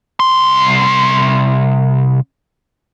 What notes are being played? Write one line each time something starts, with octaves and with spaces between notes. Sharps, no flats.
C2 C6